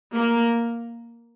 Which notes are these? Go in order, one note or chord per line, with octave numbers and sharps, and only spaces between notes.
A#3